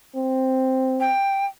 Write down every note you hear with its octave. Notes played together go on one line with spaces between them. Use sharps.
C4
G5